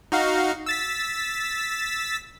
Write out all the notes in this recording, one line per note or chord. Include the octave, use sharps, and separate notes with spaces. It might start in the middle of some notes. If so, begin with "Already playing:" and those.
D#4 F#4 F5
E6 A6 B6